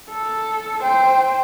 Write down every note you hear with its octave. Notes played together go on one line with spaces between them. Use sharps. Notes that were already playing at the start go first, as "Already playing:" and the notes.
A4
C5 G5